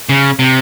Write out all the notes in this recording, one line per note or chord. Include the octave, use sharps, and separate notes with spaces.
C#3
C3